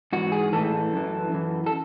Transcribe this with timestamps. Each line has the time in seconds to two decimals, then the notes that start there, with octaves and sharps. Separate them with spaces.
0.13 G#2 E3 F#4
0.32 G#4
0.53 A2 E3 A4
0.93 F#2 E3
1.32 F#2 E3
1.66 A4